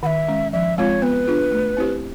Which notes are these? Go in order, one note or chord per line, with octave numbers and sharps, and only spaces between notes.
D#3 E5 F#5
G#3 C#4
F3 E5
G#3 C4 F4 C#5
B3 B4
D4 F4 G#4
A3
C4 E4 G4 C5